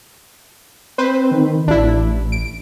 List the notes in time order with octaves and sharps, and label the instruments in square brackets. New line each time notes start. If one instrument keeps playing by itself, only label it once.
[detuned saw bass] C4 [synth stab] B4 C5
[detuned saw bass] D#3
[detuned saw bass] A1 [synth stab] D4 E4
[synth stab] D7